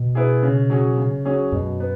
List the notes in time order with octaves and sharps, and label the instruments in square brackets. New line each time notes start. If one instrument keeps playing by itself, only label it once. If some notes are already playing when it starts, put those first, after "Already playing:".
Already playing: [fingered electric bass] B2
[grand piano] B3 E4 G#4
C#3
F#3 C#4 G#4
C#3
F#3 C#4 G#4
[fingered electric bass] F#2 [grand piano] B2
[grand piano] B3